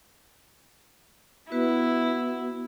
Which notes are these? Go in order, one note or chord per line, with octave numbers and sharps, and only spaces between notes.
B3 E4 F#4 B4